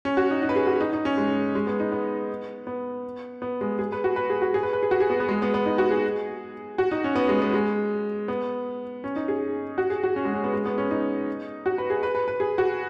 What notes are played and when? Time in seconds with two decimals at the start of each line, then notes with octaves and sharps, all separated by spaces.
0.05 C#4
0.17 F#4
0.31 D#4
0.43 D#4
0.49 B4
0.56 G#4
0.67 F#4
0.81 D#4
0.93 D#4
1.05 C#4
1.18 G#3
1.55 G#3
1.67 B3
1.80 D#4
1.92 B3
2.67 B3
3.42 B3
3.61 G#3
3.79 G#4
3.92 B4
4.04 F#4
4.16 B4
4.30 G#4
4.42 F#4
4.54 G#4
4.63 B4
4.73 B4
4.83 G#4
4.91 F#4
5.00 G#4
5.10 B3
5.20 B3
5.29 G#3
5.42 B3
5.54 B3
5.66 D#4
5.78 F#4
5.91 G#4
6.78 F#4
6.91 D#4
7.04 C#4
7.16 B3
7.29 G#3
7.42 B3
7.54 G#3
8.28 B3
9.04 C#4
9.16 D#4
9.28 G#4
9.78 F#4
9.90 G#4
10.04 F#4
10.16 C#4
10.25 G#3
10.34 C#4
10.44 B3
10.53 G#3
10.66 B3
10.78 C#4
10.91 D#4
11.66 F#4
11.78 B4
11.90 G#4
12.03 B4
12.15 B4
12.28 B4
12.40 G#4
12.58 F#4